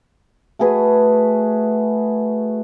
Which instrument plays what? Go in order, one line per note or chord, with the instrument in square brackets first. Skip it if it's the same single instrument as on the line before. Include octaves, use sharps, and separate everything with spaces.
[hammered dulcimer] A3 F#4 G#4 B4